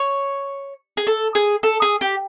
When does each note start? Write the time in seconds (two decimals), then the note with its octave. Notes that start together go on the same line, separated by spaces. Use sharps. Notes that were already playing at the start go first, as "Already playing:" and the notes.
Already playing: C#5
0.97 G#4
1.07 A4
1.35 G#4
1.63 A4
1.82 G#4
2.01 G4